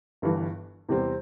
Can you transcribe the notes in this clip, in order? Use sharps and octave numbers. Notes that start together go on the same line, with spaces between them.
G1 G2 E3
E2 C3 G3 C4